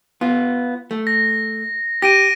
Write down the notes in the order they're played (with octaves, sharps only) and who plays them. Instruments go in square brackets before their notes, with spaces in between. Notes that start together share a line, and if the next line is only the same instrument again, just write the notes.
[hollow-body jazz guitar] B3 F4
A3
[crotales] A#6
[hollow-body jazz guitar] G4 [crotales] A#6 D7 D#7